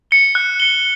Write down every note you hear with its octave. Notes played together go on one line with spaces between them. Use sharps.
C#7 G7
F#6
C#7 G7